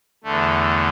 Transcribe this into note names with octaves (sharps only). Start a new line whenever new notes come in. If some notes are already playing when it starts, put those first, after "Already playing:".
E2 D3 A3